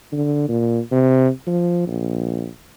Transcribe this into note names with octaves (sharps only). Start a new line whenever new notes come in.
D3
A#2
C3
F3
A#1